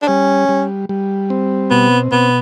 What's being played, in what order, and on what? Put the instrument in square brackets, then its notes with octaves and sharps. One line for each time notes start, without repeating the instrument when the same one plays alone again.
[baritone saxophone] D4
[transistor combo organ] G3 [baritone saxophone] C#4
[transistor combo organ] G3
G3
C4
[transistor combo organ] B2 [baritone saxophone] B3
[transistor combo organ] B2 [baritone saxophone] B3